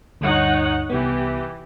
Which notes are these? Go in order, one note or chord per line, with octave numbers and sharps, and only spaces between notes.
D2 G2 D#4 C#5 F#5
C2 E3 B3 G4